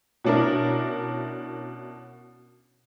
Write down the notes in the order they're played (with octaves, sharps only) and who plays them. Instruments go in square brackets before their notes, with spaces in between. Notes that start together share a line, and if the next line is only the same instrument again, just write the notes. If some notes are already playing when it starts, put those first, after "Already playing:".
[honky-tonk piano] B2 C#4 D4 E4 A#4